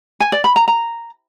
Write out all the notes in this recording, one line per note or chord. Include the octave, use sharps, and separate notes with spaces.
G#5
D5
B5
A#5
A#5